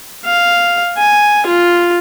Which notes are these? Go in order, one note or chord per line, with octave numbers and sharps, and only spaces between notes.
F5
G#5
F4